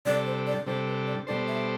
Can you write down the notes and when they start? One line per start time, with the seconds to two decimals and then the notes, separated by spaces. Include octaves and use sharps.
0.06 C3 G3 D4 A4 D5
0.26 C5
0.47 D5
0.66 C3 G3 D4 A4 C5
0.87 B4
1.07 D5
1.27 B2 G3 D4 A4 C5 D5
1.48 E5